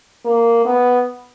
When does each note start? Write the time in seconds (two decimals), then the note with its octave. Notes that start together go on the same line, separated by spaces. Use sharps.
0.25 A#3
0.65 B3